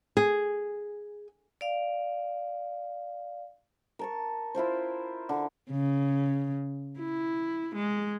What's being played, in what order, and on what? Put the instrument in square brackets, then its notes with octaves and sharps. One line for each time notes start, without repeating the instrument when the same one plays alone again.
[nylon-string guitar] G#4
[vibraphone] D5 F5
[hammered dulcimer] A#4 A5 C#6
E4 F4 A#4 C5
D3
[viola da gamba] C#3
E4
G#3